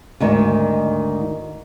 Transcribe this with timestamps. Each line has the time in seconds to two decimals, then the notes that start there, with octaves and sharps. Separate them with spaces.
0.20 D2 G#2 D#3